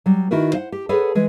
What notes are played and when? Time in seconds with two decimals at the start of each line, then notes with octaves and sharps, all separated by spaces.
0.06 F#3 G3
0.31 D#3 E4 F#4 A#4 B4
0.53 C5 F5 F#5
0.72 G4
0.89 G#4 A4 B4 C#5 F#5
1.15 E3 G#3